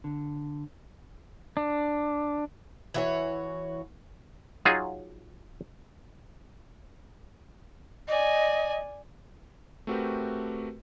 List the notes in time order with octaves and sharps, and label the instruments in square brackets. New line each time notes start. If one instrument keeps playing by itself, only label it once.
[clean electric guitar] D3
[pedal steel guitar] D4
[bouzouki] E3 F#4 C#5
[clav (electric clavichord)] F#3 D#4 F4 G#4
[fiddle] D5 G#5 [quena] D#5
[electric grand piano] A3 C4 F#4 G4 A#4 B4